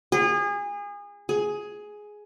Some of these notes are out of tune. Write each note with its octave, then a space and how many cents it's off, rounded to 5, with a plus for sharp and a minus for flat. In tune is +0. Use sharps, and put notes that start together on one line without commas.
G#4 -30
G#4 +10